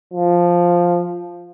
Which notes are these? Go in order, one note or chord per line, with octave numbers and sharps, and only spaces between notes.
F3